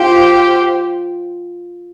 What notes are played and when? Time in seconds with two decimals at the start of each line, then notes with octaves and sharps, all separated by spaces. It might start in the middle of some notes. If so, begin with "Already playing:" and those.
Already playing: F4 G4 C5 F5